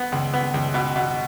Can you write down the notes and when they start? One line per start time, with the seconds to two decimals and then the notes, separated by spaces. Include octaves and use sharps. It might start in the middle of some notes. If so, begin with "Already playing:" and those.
Already playing: B3
0.12 C#2
0.34 B3
0.54 C#2
0.74 B2
0.96 B2